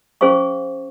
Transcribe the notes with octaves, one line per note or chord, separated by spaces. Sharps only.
C#4 G#4 C5 F5 C#6